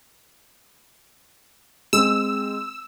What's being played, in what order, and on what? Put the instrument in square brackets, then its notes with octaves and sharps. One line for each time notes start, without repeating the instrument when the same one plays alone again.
[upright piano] G#3 C4 [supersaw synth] E6